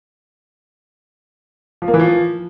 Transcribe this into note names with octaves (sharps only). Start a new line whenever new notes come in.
F3
A#3
E3
F3